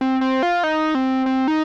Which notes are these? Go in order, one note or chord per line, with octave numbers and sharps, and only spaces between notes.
C4
C4
F4
D#4
C4
C4
D#4